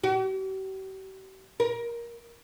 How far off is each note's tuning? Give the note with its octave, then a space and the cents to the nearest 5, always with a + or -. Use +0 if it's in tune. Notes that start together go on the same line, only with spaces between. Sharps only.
G4 -45
A#4 +15